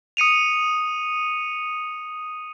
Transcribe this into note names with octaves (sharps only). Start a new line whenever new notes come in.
D#6 C#7 D#7 F7